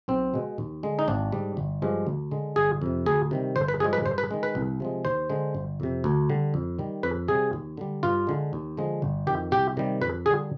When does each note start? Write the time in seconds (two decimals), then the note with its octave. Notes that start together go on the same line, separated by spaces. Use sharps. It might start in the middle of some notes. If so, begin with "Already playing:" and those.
0.08 B1 C4
0.34 B2 G#3
0.58 D#2
0.83 D3 G#3
0.99 D#4
1.08 G#1 D4
1.32 G#2 G3
1.57 G1
1.82 G2 F3 G#3
2.07 D2
2.31 D3 G#3
2.56 G1 G#4
2.82 F2 C3
3.06 D2 G#4
3.31 C3 D#3 G3
3.56 G1 C5
3.68 B4
3.80 G2 F3 G#3 G#4
3.93 B4
4.05 G2 C5
4.18 B4
4.31 D#3 G#3
4.43 B4
4.55 C2
4.80 C3 F3 G#3
5.05 D#2 C5
5.30 D3 G#3
5.55 G1
5.80 F2 C3
6.04 D2
6.29 D3 G3
6.54 F2
6.79 D#3 G3
7.03 F2 B4
7.28 C3 G3 G#4
7.53 D#2
7.77 D3 G3
8.03 G2 F4
8.27 D3 G#3
8.53 D#2
8.77 D3 F3 G#3
9.02 G1
9.27 D#3 G4
9.31 F2
9.51 C2 G4
9.77 C3 D#3 G3
10.01 F2 B4
10.26 D3 G3 G#4